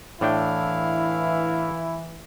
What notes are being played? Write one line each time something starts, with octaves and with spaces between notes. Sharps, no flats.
A2 E3 D4 E4 F5 G5